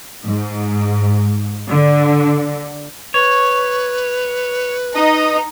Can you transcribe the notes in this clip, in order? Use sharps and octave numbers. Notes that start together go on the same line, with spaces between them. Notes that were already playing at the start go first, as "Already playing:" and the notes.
G#2
D3
B4 C#5
D#4 D#5 D#6